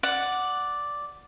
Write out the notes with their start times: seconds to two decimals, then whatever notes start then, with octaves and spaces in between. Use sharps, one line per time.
0.03 D5 F#5